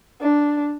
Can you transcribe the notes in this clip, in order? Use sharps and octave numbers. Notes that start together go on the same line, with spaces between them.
D4